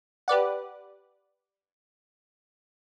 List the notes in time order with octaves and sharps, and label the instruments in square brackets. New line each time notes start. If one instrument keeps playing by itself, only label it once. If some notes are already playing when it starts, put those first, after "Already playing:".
[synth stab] G4 B4 D5 F#5